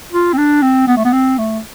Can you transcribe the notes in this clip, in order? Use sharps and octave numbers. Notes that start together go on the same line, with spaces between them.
F4
C4
D4
C4
B3
A3
B3
C4
A3